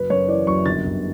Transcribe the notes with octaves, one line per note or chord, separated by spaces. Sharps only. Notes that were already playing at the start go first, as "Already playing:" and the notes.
Already playing: F#1 B4
F#2 C#5
E3 D5
F#1 C#6
G1 A6
G1